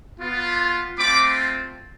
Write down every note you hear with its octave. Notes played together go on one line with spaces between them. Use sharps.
B3 F4
A3 C4 F4 B5 D6